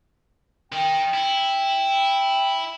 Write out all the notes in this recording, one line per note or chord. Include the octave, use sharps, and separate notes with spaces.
D#3 D#4 G5
E4